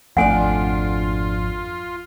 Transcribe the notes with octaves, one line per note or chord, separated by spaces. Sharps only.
G#1 F2 A3 D4 F4 D5 F#5 G#5